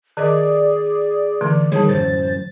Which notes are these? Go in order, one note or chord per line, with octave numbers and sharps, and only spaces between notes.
D#3 G#4 D5 D#5
D3 E3 A3
D#3 G3 G#4 C#5 A5
F#2 A2 C5 A6